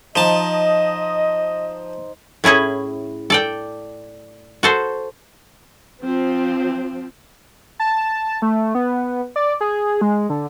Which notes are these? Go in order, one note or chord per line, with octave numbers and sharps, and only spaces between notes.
F3 D#4 C5 D#5 A5
A2 C#4 E4 G#4
A4 D5 G5
F#4 A4 C5
F3 C4
A5
A3
B3
D5
G#4
G#3
D3